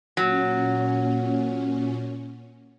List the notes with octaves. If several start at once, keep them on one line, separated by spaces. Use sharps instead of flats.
A#2 F#3 C#4